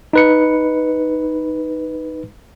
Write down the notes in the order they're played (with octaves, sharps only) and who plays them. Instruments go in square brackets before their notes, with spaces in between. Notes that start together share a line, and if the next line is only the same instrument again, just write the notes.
[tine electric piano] D#4 B4 C#7